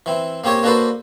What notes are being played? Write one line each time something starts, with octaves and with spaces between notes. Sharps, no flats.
E3 C4
A#3 C4 G4 C#5 G#5
A#3 D4 F#4 A4 B4 C5